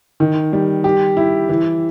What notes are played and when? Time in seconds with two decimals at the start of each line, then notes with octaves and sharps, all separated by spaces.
0.20 D#3
0.53 G3
0.84 G4
1.17 E4
1.49 E3